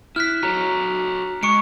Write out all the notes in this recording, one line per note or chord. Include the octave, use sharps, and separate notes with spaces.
E4 F6 F#6 B6
F#4 A4 C#5 A#5
G#3 C#6 C#7 D7